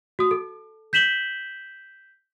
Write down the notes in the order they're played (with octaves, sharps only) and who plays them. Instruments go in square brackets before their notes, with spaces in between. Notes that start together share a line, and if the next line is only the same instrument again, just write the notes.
[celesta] F#4 D#6
A4
G6 B6 E7 F#7 G7